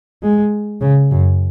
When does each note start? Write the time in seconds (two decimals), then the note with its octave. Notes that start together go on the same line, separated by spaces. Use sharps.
0.23 G#3
0.81 C#3
1.11 F#2